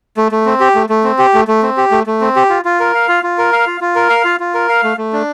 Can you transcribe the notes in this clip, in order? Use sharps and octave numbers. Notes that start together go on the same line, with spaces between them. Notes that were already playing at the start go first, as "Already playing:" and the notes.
A3
A3
C4
G4
A3
A3
C4
G4
A3
A3
C4
G4
A3
A3
C4
G4
F4
F4
A#4
F5
F4
F4
A#4
F5
F4
F4
A#4
F5
F4
F4
A#4
F5
A3
A3
D4